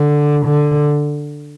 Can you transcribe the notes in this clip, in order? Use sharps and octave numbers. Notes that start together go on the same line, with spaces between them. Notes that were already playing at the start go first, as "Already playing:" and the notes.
Already playing: D3
D3